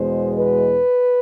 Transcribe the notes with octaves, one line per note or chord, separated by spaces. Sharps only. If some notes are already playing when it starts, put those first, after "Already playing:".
Already playing: E2 B2 G#3 C5
B4